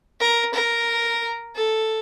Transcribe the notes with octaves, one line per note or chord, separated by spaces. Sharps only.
A#4
A#4
A4